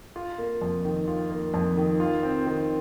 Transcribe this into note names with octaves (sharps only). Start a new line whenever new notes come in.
F4
A#3
F2
D#3
F4
A#3
F2
D#3
F4
C4
D#3